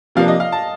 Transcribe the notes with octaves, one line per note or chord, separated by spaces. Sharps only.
C3 F3 A#3 D4 F5
D#5
F5
A5